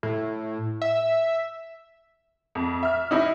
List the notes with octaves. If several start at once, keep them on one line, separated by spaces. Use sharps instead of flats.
A2
E5
F2
E5 F6
D#4 E4 D#5